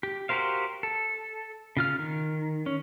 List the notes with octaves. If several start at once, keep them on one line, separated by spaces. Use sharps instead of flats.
G4
F#4 G4 A#4 C5 F5
A4
C#3 F4 F6
D#3
C#4